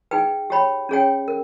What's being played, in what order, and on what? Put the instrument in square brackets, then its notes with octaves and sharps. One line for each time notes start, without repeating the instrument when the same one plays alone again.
[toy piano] D#4 G#4 B4 G5
G4 C#5 G5 B5
C#4 G#4 C#5 G5
A#4